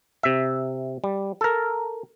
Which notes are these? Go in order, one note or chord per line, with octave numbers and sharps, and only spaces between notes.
C3 E5
G3
A4 A#4